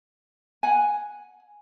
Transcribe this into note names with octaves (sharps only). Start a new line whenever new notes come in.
F#5 G#5